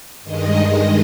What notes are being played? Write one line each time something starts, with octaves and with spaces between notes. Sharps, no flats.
G2 D#3 G#3 D#5